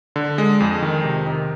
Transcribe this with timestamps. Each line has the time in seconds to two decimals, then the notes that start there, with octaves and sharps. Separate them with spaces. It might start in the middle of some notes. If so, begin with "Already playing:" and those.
0.16 D3
0.38 G#3
0.60 F2
0.82 D#3
1.04 C3
1.27 D#3